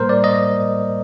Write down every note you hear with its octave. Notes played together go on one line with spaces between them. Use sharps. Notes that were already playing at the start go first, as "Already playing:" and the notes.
Already playing: A2 G3 A#3 A#4 C5
D5
D#5